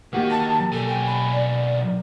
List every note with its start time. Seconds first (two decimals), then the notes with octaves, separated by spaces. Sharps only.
0.13 D#3 A#3 F#4 G4 D#5
0.30 A5
0.72 B1 A4 G#5
0.88 G5
1.06 B5
1.33 D5